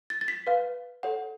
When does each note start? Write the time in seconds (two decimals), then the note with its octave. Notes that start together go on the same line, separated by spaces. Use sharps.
0.10 A6
0.21 A6
0.28 B6
0.47 B4 F5
1.03 A4 C#5 F#5